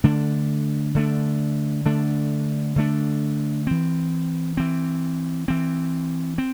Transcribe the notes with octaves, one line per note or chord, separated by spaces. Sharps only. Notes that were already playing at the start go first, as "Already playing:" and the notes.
D3 A3 D4
D3 A3 D4
D3 A3 D4
D3 A3 D4
E3 C4
E3 C4
E3 C4
C4